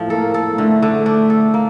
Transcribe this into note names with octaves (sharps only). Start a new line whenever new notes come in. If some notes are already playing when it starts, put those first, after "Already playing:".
Already playing: A2 F3
A#3 A4
A4
D3 A3
D3
D4
A4
A#3